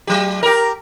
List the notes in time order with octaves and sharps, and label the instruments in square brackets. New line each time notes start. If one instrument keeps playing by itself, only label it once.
[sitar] F#3 G4
G4 A#4